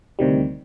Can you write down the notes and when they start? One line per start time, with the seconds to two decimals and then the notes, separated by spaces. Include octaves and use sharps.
0.19 D2 C3 D#3 G3